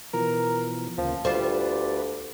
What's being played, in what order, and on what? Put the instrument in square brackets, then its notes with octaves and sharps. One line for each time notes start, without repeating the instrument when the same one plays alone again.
[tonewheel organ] B2 E3 F3 [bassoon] A#4
[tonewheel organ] D2 C#3 A#3 [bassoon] F3
[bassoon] D2 [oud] G3 F4 C5 [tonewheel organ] B4 D5